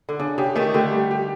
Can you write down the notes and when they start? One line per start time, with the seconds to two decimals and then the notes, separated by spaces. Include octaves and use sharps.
0.09 D3
0.19 C#3 D4
0.38 C#3 G4
0.56 D#3 A3
0.74 D3 G4
0.93 G3
1.11 G4